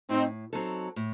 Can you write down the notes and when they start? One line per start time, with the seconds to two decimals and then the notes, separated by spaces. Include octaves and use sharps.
0.09 A2 C4 D#4
0.53 F#3 C4 D#4 A4
0.96 A2